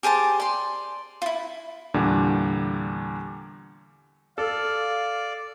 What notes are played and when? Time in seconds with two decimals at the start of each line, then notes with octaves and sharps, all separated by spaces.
0.03 G4 G#4 C5 A5
0.40 D5 C6
1.22 E4 F4
1.94 E2 A#2 D3 G3 D4
4.38 A4 D5 F5